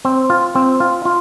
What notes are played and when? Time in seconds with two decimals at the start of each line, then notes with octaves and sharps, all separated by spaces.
0.05 C4
0.30 F4
0.55 C4
0.80 F4
1.05 F4